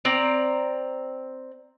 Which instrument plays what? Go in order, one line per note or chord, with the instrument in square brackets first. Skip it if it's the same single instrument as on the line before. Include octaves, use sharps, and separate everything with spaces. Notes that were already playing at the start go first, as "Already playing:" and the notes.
[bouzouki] C4 D5 A#5